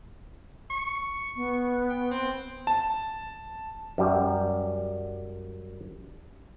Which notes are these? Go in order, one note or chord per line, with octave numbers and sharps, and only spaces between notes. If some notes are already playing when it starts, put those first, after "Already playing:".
C#6
B3
G5
C4
A5
F#2 G3